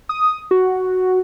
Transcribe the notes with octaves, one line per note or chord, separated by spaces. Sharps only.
D#6
F#4